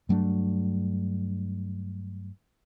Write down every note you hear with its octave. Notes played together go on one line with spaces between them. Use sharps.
G2 F#3 A3 D4